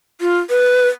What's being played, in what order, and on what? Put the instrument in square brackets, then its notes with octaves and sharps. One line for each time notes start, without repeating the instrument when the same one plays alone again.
[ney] F4
B4